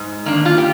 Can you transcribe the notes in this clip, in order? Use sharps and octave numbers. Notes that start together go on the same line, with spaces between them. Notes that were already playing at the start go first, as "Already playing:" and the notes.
Already playing: G#2
D#3 A#3 D4
F4
G4